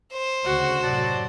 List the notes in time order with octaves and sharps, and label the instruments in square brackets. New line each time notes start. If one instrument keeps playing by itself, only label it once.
[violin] C5
[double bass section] D2 C#3 [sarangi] F#4
[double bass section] F#2 A2 C3 [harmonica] F#3 D5 A5